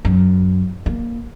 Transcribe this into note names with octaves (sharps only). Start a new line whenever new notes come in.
F#2
A#3